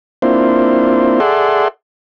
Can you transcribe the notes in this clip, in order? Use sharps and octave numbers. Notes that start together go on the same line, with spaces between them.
A#3 C4 D4 E4 F4 C5
G#4 A4 D5 E5 F#5 C6